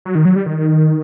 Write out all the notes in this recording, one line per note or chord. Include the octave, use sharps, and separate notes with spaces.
F#3
D#3
F#3
G3
D#3